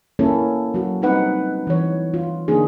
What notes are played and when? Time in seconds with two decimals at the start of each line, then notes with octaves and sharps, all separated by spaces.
0.19 A#3 C#4 E4 A4 C#5
0.74 F#3 F#4
1.02 F#3 G3 C4 D#4 B4 F#5
1.67 E3 C#5
2.14 F4
2.48 D3 A#3 D4 D#4 G#4